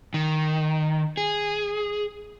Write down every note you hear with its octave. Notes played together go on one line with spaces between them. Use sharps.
D#3
G#4